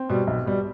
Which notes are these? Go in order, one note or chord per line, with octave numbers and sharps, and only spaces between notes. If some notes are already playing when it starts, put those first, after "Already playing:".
Already playing: C4
B2 G3
B1
B2 G3